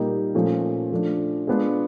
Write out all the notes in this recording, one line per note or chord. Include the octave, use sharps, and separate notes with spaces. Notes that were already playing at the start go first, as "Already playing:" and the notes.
Already playing: A#2 G3 A#3 D#4 G4
A#2 F3 A3 C#4
F3 A3 D4
G#3 B3 D4 F4